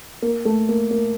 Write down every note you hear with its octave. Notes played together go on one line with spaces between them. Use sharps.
A#3
A3
A#3
A#3